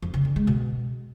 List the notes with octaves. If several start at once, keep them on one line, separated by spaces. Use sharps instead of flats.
F2
C#3
D3
G#3
B2